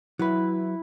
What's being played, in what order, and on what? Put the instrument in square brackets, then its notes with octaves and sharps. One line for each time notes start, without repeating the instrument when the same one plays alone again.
[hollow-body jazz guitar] F#3 B4 [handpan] E4